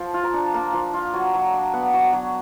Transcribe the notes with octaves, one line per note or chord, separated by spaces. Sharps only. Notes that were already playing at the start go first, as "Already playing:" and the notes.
Already playing: F3
F4
A#5
D4
A#3
F3
F4
F#3
F#3
D4
B3 F#5
F#3
F#3